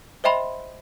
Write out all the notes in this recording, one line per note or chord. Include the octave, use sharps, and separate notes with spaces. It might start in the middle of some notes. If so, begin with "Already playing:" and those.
C5 D#5 E5 G5 B5 C6